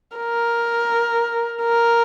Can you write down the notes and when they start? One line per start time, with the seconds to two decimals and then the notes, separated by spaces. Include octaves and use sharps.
0.17 A#4
1.62 A#4